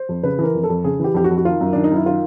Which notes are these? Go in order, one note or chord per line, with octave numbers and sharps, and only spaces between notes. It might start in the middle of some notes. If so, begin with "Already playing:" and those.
Already playing: C5
F2
C#3 B4
E3 A#4
F2
A4
F2
C#3 G#4
E3 G4
F2 G4
F#4
F2
F#4
D#3 F4
F#2
D#3 D4
D#4
F#2 E4
D#3 F4